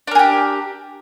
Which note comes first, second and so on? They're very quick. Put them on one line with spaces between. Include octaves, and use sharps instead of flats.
D4 A#4 G#4 G4